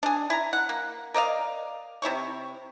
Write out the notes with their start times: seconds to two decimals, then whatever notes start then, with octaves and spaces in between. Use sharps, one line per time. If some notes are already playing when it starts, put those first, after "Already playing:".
0.03 D4 G#4
0.30 E4 A#5
0.53 F#5
0.69 A#3
1.14 A#4 D5 D#5 F5
2.02 C3 E4 C#5 C#6